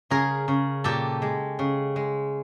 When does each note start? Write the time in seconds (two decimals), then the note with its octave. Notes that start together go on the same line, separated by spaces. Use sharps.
0.10 C#3 G#4 A#4
0.48 C#3
0.84 A#2 G4 A4
1.22 G#3
1.59 C#3
1.96 G#3